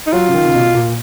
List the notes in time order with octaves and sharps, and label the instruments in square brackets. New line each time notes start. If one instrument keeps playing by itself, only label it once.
[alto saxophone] D#4
[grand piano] F#3 [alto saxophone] F4
[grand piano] C#3
D#3
C#3
B2
A#2